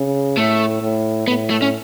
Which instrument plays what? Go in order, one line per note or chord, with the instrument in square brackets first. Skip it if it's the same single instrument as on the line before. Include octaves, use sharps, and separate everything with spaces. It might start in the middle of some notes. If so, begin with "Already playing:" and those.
Already playing: [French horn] C#3
[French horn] A2 [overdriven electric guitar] A3
[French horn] A2
[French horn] A2 [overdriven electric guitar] B3
[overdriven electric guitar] A3
C#4